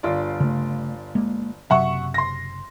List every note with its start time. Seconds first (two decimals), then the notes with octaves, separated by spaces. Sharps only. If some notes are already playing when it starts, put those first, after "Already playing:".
0.03 G1 F4 D5
0.40 C#3 A3
1.15 G#3 A#3
1.70 F#1 C3 F#3 E5 F#5 C#6
2.14 C6 A#6